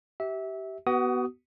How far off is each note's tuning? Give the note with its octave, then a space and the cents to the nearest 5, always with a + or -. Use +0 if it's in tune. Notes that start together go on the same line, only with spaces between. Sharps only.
G4 -25 E5 -20
B3 +0 F#4 +30 D#6 +0